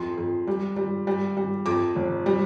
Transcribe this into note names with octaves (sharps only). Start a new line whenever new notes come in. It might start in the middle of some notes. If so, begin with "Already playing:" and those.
Already playing: F2 C6
F2
G3
G3
G3
G3
F2 D6
F1
G3